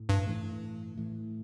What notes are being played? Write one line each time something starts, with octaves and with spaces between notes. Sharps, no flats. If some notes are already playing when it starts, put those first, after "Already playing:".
Already playing: A2
G2
A2 E3 A3
A2 E3 A3